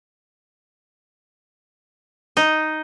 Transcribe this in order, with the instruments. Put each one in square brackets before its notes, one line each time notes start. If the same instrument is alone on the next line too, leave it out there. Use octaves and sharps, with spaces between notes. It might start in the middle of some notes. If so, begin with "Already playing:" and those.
[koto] D#4